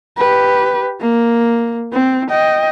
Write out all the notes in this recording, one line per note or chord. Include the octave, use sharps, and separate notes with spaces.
G4 B4
A#3
C4
D#5 G5